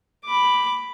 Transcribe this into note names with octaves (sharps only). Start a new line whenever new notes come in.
B5 D6